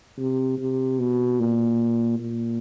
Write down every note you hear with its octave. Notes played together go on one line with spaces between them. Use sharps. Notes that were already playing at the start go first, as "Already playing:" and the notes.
C3
C3
B2
A#2
A#2